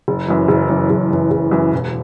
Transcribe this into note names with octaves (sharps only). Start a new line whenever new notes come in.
F#1
F#2 E3
F#1
F#2 E3
F#1
F#2 E3
F#1
F#2 E3
E1